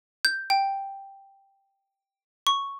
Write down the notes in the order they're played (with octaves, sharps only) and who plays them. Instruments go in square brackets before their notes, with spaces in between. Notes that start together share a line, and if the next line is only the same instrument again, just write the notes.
[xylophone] G6
G5
C#6